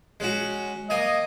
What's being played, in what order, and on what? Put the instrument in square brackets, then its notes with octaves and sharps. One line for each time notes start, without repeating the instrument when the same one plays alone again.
[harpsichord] G#3 C#4 F#4
[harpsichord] A#3 G#5 A#5 [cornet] D#5